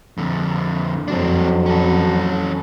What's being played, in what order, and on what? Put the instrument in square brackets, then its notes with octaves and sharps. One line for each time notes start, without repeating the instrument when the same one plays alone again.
[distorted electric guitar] F2 D3
[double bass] F2 F#3 [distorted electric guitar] C4 D4
[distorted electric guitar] C#4 A4